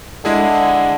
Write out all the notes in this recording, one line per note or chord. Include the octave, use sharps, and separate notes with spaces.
D3 G#3 E4 G#4